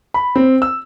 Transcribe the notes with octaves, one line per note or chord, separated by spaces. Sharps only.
B5
C4
E6